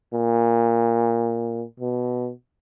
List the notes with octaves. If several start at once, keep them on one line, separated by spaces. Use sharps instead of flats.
A#2
B2